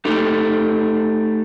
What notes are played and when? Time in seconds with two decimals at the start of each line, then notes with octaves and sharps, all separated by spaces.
0.05 A3 D#4 G4